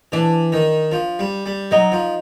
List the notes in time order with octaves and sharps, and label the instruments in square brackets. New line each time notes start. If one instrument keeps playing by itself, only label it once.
[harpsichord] E3 [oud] D4
[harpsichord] D#3
F3
G3
G3
[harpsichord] F#3 [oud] D#4
[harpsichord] F3